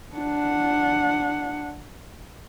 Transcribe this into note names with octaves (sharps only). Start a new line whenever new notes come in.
D4 F#5